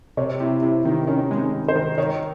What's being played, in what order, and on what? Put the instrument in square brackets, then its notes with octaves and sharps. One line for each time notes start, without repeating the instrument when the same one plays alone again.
[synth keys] C3 [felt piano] C#5
[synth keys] C3 [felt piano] E4
[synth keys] C3 [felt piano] E4
[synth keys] D#3 [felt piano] D#4
[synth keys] D#3 [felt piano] C#4
[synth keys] G#3
[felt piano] D#4
[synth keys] G#3
[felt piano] C5
[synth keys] D#3
[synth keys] D#3 [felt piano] C#5